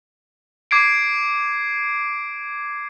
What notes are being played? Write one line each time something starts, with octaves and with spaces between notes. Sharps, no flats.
D6 G#6 C7 D7